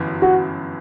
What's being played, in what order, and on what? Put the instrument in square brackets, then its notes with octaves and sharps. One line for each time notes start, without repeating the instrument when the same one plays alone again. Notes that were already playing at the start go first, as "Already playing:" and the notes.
Already playing: [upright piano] G1 F#2 E3
[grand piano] F#4